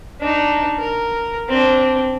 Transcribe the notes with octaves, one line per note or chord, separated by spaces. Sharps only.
D4 D#4
A#4
C4 D4